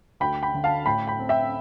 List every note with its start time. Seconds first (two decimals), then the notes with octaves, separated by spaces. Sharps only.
0.20 D2 G5 B5
0.43 G5 B5
0.54 D3
0.64 F5 A5
0.86 A2 G5 B5
1.07 G5 B5
1.19 C4
1.29 E5 G5